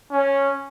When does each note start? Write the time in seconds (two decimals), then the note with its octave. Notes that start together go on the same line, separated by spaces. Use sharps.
0.12 C#4